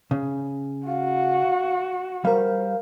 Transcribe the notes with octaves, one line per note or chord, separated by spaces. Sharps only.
C#3
F#4 F5
G3 A#4 C5 F5